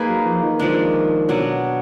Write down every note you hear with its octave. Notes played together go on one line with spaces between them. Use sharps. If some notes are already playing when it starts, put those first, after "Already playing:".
Already playing: A#3 D#4 G#4 B4
F#3
F3
D#3
F3 G#3 D4
B2 F#3 D4